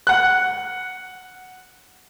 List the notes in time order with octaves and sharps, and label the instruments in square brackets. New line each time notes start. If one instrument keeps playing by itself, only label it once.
[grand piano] F#5 F#6